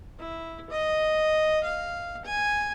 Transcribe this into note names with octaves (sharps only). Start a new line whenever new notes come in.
E4
D#5
F5
G#5